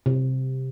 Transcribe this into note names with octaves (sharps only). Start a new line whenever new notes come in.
C3